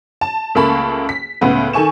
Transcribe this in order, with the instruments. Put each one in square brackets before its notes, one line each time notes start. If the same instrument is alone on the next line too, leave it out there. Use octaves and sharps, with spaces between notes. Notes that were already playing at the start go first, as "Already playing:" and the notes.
[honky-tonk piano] A5
C#2 A3 A#3 A5 B5 C#6
B6
C#2 A2 B3 B4
D#3 A4 G#5 C#6 E7